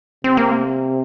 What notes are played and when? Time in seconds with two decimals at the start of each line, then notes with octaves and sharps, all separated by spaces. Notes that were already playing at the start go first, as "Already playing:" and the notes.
0.24 C3 C4
0.37 A#3